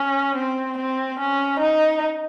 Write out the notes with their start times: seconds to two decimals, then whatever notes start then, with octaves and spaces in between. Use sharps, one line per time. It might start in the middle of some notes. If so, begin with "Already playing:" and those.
Already playing: C#4
0.36 C4
0.78 C4
1.20 C#4
1.60 D#4